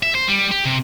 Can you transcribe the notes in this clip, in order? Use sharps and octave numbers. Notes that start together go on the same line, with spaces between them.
E5
C5
G3
G4
C3